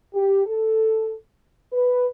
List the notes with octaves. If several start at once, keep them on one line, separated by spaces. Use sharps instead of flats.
G4
A4
B4